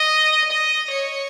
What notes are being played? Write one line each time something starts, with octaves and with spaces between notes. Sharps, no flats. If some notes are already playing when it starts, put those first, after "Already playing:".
Already playing: D#5
D#5
C#5